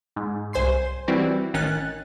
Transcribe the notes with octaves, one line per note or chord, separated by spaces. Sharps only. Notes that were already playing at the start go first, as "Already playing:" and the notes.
G#2
C2 C5 G#5 C6 C7
E3 G3 C4 E4 F#4
A1 D#3 C#4 F#6 A6